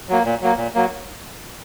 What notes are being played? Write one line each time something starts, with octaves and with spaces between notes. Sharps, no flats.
F#3 A#3
A#2
F#3 A#3
A#2
F#3 A#3